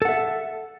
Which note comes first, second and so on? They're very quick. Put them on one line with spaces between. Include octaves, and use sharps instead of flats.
A4 F#5 E5